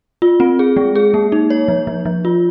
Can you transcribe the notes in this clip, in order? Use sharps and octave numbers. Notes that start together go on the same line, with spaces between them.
F4
C4
G#4
G#3
G#4
A#3
D#4
C#5
F3
F3
F3
F4